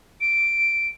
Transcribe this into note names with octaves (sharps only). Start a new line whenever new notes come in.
D7